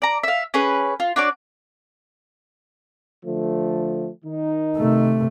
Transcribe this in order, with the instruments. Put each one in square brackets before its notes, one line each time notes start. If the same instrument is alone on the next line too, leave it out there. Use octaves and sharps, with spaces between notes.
[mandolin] D5 A#5
E5 F5
C#4 G#4 B4
F4
D4 F#4 C#5 D5
[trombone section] D3 F3 A3
D#3 D#4
[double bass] C3 A3